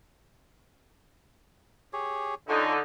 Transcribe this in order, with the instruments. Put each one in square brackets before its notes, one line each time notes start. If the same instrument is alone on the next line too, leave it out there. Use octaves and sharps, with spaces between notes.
[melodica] G4 G#4 C#5
[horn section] D3 D#4 [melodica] F4 C#5 G#5